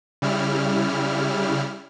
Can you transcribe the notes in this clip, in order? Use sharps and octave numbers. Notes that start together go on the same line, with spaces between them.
C#3 G3 E4 F6